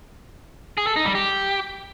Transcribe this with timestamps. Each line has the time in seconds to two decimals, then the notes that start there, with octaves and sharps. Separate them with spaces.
0.78 G#4
0.87 A4
0.96 D#4
1.06 G3
1.15 G4